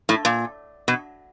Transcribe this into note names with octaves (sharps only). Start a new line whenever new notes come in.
A2
A#2
B2